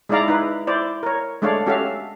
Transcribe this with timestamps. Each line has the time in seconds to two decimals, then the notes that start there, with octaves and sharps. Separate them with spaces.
0.09 G#3 D#4 E4 D5 F5 A#5
0.28 D#4 E4 B4
0.67 E4 C5 D5
1.03 A#4 C#5
1.42 G#3 A3 D4 C#5 D5 F5
1.67 C#4 F#4 G4 A4 E5 F5